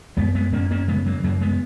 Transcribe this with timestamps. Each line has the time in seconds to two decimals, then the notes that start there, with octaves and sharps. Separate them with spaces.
0.17 F#2 G#3 B3
0.35 G#3 B3
0.52 F#2 A#3 C#4
0.71 A#3 C#4
0.88 C#3 G#3 B3
1.06 F#3 A#3
1.24 F#2 F#3 A#3
1.41 G#3 B3